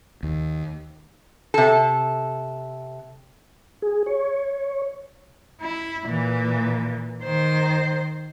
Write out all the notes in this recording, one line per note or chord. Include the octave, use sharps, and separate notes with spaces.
D#2
C3 A4
G#4
C#5
E4
A#2 E3
D#3 C5